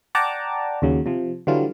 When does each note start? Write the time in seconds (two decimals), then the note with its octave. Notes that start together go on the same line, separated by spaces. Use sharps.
0.15 D5 F#5 G5 A5 A#5 D6
0.82 D#2 C#3 F#3
1.06 C3 F3
1.47 D3 E3 F#3 G3 F4